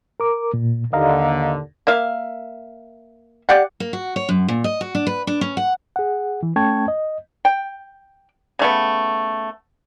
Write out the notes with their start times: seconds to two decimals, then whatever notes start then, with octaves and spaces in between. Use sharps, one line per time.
0.20 A#4 D6
0.54 A#2
0.93 D#2 D3 D#5 F5 A#5
1.87 A#3 E5 F5
3.49 G4 D5 F5 F#5
3.80 A#3
3.93 F#4
4.16 C#5
4.29 F#2
4.48 A#2
4.64 D#5
4.81 F#4
4.95 D4
5.07 B4
5.27 D4
5.41 C#4
5.57 F#5
5.96 G#4 F#5
6.43 E3
6.56 A3 C#4 G5 A5 C#6 G#6
6.88 D#5
7.45 G5
8.59 C#3 A3 B3